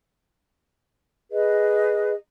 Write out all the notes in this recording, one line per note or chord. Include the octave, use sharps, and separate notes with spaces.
G#4 B4 D#5